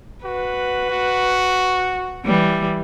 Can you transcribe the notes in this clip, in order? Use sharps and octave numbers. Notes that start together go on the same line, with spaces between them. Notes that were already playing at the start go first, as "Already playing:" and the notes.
F#4 B4
F#4
E3 G3